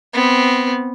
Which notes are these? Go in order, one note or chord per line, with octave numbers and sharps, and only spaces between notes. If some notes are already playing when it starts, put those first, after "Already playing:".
B3 C4